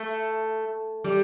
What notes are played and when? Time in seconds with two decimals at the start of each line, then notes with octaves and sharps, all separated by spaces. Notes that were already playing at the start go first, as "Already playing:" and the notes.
Already playing: A3
1.04 G3